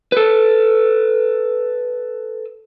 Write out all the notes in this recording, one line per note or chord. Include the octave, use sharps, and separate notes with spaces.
A4 B4